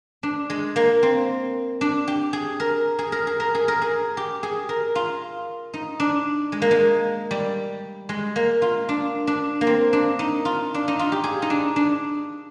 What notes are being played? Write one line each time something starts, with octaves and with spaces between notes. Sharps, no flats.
D4
G#3
A#3
C4
D4
G4
G#4
A#4
G#4
A#4
G#4
A#4
G#4
A#4
G#4
G4
G#4
A#4
F4
D#4
D4
G#3
A#3
G#3
G3
G#3
A#3
F4
D4
D4
A#3
C4
D4
D#4
F4
D4
D#4
F4
G4
G#4
D#4
D4
D4